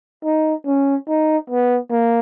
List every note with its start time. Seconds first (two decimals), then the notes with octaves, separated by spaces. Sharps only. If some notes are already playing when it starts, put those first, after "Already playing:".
0.25 D#4
0.67 C#4
1.08 D#4
1.50 B3
1.91 A#3